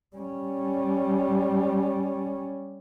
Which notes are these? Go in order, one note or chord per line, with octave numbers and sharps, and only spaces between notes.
G3 C#4